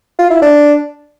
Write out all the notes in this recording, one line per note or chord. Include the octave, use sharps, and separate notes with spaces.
F4
E4
D4